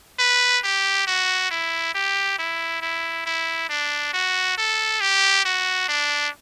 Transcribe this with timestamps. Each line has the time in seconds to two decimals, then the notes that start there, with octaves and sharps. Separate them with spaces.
0.19 B4
0.64 G4
1.07 F#4
1.51 E4
1.95 G4
2.39 E4
2.82 E4
3.26 E4
3.69 D4
4.13 F#4
4.58 A4
5.01 G4
5.45 F#4
5.89 D4